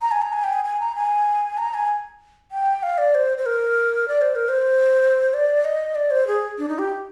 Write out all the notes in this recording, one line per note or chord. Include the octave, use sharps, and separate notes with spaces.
A#5
G#5
A#5
G#5
G5
G#5
G#5
A#5
G#5
A#5
G#5
G5
F5
D5
C5
C5
A#4
D5
C5
A#4
C5
D5
D#5
D5
C5
G#4
D4
D#4
G4